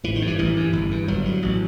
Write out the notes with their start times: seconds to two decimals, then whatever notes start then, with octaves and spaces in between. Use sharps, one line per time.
0.04 A1 E3
0.16 D#3
0.22 G2
0.27 E3
0.39 A1 E3
0.56 G2
0.73 G1
0.91 G2
1.08 G1 F#3
1.25 G2
1.42 A1